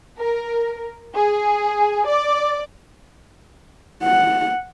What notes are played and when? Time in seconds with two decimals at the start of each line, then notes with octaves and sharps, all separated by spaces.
0.18 A#4
1.15 G#4
2.06 D5
4.04 F#5